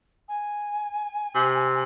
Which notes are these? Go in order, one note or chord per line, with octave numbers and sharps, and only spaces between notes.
G#5
C3